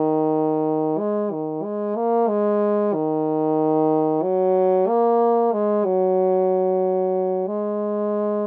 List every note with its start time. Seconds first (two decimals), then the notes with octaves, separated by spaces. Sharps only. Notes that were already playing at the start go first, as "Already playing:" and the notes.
Already playing: D#3
0.99 G#3
1.32 D#3
1.63 G#3
1.96 A#3
2.28 G#3
2.93 D#3
4.23 F#3
4.88 A#3
5.52 G#3
5.85 F#3
7.47 G#3